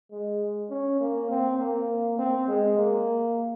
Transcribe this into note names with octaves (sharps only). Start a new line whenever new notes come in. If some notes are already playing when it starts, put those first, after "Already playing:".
G#3
C#4
A#3
C4
A#3
C4
G#3
A#3